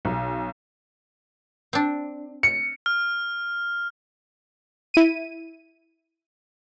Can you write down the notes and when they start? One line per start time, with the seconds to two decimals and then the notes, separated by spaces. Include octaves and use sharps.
0.05 B1
1.73 C4 D4
2.43 C#7
2.86 F6
4.94 E4 D#7